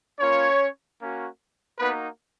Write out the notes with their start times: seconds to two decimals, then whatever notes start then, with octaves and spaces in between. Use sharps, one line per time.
0.19 A#3 C#4 F4 C#5
0.99 A#3 C#4 F#4
1.78 A#3 B3 D#4 F#4 B4